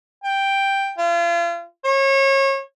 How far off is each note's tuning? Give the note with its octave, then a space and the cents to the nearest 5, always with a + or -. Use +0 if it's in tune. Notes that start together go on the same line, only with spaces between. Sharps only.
G5 +5
F4 -35
C#5 -30